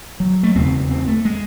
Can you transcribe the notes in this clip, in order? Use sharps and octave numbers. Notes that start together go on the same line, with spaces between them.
F#3
A3
E2 C#3 C4
C4
A3
G#3